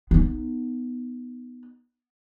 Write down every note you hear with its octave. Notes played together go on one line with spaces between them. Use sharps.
B3 D#4